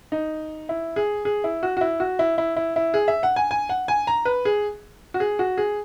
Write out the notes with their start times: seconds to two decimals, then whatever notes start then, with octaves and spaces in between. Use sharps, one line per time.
0.12 D#4
0.69 E4
0.96 G#4
1.25 G#4
1.44 E4
1.63 F#4
1.77 F#4
1.81 E4
2.00 F#4
2.19 E4
2.38 E4
2.56 E4
2.76 E4
2.94 G#4
3.08 E5
3.23 F#5
3.36 G#5
3.51 G#5
3.69 F#5
3.88 G#5
4.07 A#5
4.25 B4
4.45 G#4
5.14 F#4
5.20 G#4
5.39 F#4
5.58 G#4